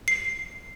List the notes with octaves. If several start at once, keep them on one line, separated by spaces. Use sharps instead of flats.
C7